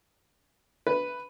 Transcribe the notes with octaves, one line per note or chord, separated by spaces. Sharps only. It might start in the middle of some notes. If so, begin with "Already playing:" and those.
B4